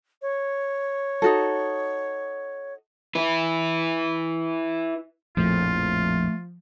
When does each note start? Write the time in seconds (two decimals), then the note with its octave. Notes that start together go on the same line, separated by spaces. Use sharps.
0.22 C#5
1.22 D#4 F#4 A4
3.15 E4 B4
5.37 A#1 F2 A2 F3 A3 F4